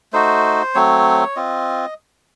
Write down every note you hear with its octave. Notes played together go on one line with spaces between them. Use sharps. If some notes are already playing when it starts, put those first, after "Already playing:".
A3 D#4 F#4 C5
F#3 A3 C4 C#5
C4 F4 D#5